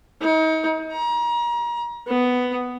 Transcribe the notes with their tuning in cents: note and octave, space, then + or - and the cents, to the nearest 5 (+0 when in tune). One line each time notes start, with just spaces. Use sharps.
D#4 +35
A#5 +35
B3 +10